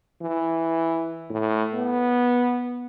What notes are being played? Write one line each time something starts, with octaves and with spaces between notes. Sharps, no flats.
E3
A2
B3